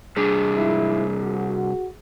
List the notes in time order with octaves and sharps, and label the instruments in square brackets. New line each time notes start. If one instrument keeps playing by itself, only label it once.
[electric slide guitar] C3 G3 D4 [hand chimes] G#4
[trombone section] G#2 F3 E4
F#4